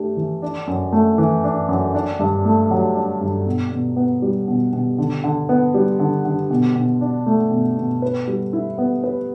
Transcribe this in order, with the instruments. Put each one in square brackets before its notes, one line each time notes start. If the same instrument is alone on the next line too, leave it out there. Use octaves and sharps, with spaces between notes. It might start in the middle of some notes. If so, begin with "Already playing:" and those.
Already playing: [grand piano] A3 D4 G4
E3
D4
F#2
A3
E3
D4
F#2
D4
G2
A3
F#3
D4
G2
B2
B2
B3
G3
B2
B2
D3
D3
B3
G3
D3
D3
B2
B2
D4
A3
B2
B2
B4
G3
E4
B3
B4